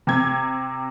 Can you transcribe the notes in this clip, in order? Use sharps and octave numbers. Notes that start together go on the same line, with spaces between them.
C3 G#6